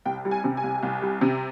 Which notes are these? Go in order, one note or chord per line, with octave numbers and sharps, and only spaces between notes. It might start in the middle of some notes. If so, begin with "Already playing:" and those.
C2 G5
G3
G#5
C3
G#5
C2
C2
G3
C3